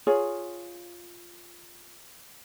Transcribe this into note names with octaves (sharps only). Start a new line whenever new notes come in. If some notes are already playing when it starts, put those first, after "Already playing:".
F4 G#4 C#5